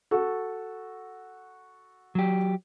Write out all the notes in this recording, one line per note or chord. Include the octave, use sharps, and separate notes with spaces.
F#4 A4
F#3 G4